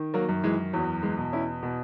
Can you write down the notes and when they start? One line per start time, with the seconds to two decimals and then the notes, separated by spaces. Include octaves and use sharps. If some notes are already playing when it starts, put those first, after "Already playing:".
Already playing: D#3
0.14 F#3 A#3
0.29 F#2
0.44 E3 G#3
0.73 E2 F#3
1.03 E3 G#3
1.18 B2
1.33 C#4 E4
1.63 B2